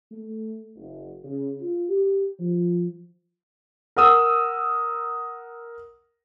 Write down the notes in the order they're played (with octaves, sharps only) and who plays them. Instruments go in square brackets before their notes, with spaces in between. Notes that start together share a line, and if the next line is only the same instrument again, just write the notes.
[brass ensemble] A3
F#1
C#3
F4
G4
F3
[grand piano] A#4 F#5 D#6 E6